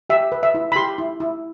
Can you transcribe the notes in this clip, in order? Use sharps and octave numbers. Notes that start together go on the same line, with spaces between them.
G4 E5
B4
E5
E4
B5
G4 C6
E4
E4